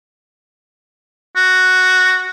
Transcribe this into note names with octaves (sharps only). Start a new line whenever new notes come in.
F#4